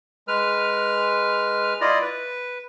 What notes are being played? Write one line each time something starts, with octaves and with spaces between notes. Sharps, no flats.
G#3 B4 F6
E4 F4 D5 D#5
B4